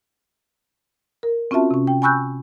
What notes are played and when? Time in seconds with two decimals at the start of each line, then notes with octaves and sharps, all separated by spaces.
1.23 A#4
1.51 C4 C#4 F4 F#4 E5 A5
1.71 C3 C#4
1.87 G5
2.02 G#5 B5 C#6 E6 F#6 G6